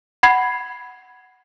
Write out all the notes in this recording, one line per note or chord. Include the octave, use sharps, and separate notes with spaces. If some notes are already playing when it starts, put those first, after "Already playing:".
F#5 B5 G#6 C7